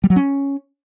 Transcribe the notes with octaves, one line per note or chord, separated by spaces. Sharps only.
G3
F#3
C#4